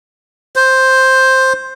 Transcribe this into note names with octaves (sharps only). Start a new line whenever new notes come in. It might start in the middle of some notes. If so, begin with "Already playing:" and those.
C5